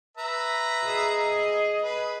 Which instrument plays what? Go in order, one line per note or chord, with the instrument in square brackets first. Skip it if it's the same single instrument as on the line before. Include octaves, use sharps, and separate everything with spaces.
[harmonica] B4 E5 A#5
[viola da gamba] G#4 D#5
[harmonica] B4